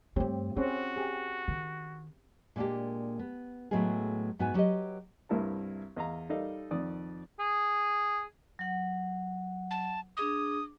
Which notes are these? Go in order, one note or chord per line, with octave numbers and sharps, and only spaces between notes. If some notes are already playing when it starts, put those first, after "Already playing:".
G2 A3 C4 G4 C#5
C4 C#4 F4 F#4 G#4
G4 G#4
D#3
A#2 G#3 A#3 C#4 D4 G4
B3
A2 F#3 G#3 A3 B3 G#4
G#2 B3 F#4 F#5 G#5
F#3 G4 B4 D#5
C2 G2 E4 A#4 A5
E2 D#5 F5 A#5
G3 D#4 A4 D5 D#5 F5
F2 D#3 D5 D#6
G#4
F#3 F#5
A5
D4 G#4 D6 D#6